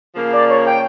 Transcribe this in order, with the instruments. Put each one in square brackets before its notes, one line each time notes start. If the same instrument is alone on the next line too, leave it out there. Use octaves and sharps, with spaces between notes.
[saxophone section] C#3 F3 A#3
[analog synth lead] D5
C#5
G5